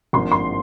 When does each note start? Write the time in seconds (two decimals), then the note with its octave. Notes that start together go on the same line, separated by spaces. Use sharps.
0.13 G#1 G2 F3 A#3 C6
0.32 C6